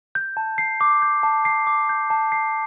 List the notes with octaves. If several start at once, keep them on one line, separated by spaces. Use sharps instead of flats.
G6
A5
C7
D6
G6
A5
C7
D6
G6
A5
C7